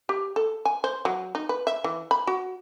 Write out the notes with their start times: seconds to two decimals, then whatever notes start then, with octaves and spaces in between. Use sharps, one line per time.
0.09 G4
0.36 A4
0.65 G#5
0.84 C5
1.05 F#3
1.35 D#4
1.49 B4
1.67 E5
1.84 E3
2.11 B5
2.27 F#4